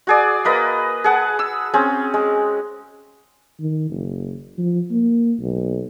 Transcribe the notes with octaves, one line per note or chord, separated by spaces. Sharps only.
F#4 G#4 D5
A#3 B4 D#5
G#4 F#5 A5
E6
C4 C#4 G#4
G#3
D#3
F#1
F3
A#3
B1